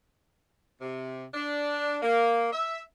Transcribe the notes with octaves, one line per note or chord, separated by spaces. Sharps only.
C3
D4
A#3
E5